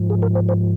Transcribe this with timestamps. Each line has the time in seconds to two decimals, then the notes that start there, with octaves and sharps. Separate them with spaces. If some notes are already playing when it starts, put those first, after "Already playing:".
Already playing: G#2 F3
0.10 G#4
0.22 A#4
0.35 C5
0.49 C5